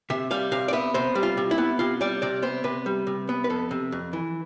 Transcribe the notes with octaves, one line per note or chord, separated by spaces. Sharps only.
C3 E5
G3 F5
C3 F5
D5
B3 E5
C3 C5
G3
F4
C3
E4
B3
C3 F4
G3 D5
C3 D5
B3 C5
C3 B4
G3
C3
B3
B4
F2 A4
C3
F2
E3